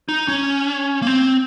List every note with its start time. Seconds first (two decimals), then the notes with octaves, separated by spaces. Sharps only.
0.09 D#4
0.28 C#4
1.02 A#3
1.07 C4